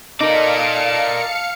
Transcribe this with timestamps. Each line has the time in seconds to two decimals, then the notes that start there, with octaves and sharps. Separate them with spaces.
0.20 D#4 A4 A#4 D5 D#5 F5 A5 C#7